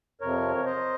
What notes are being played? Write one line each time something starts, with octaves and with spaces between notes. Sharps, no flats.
F2 C3 F3 A#4 C#5
C#5
C5 D#5